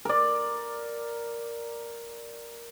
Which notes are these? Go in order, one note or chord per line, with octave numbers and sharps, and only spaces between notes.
A#4 D5